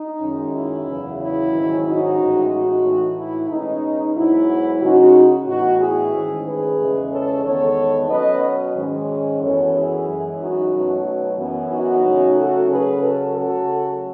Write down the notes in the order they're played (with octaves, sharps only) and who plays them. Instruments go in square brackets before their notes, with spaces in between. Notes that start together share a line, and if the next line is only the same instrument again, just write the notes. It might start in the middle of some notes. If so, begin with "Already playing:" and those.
Already playing: [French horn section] D#4
F#2 D#3 G#3 C#4
E4
E2 C#3 F#3
E4
G#2 D#3 F#3 C#4
D#4 F#4
A2 E3 G#3 C#4
D#4 F#4
A2 E3 A3
E4
B2 G#3 C#4 D#4
G#2 F#3 B3 E4
C#3 G#3 C#4 D#4 F#4
A2 E3 B3 D#4 F#4
E4 G#4
G#2 D#3 A3 C#4
G#4 B4
E2 C#3 E3 G#3 C#4
A4 C#5
E2 D#3 G#3 B3 A4 C#5
B2 F#3 C#4 B4 D#5
G#2 D#3 G#3 C#4
F#2 E3 B3 A4 C#5
E4 G#4
F#2 E3 G#3
D#4 F#4
B2 F#3 A3 C#4
F#2 E3 B3
D#4 F#4
C#3 F#3 A3 C#4
F#4 A4
C#3 F#3 C#4 G#4 B4
F#4 A4
C#3 F#3 A3 F#4 A4